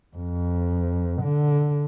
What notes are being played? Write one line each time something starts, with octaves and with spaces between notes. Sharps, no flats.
F2
D3